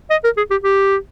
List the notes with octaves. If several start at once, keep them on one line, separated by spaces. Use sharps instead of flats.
D#5
A#4
G#4
G4
G4